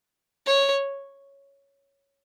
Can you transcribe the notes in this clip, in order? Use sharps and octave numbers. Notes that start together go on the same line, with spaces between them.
C#5